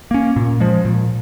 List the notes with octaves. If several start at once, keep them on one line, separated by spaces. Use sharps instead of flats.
A#3 C#4
A#2
F3 G#3
A#2